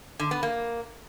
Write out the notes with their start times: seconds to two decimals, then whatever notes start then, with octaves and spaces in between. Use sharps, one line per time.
0.19 D3
0.31 B3
0.43 A#3